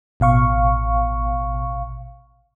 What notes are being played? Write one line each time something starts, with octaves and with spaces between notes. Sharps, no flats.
A1 B2 F5 C#6